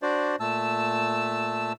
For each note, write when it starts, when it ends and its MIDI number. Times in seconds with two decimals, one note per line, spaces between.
0.02 0.36 62
0.02 0.36 66
0.02 0.36 72
0.02 0.36 74
0.40 1.73 46
0.40 1.73 57
0.40 1.73 81
0.40 1.73 88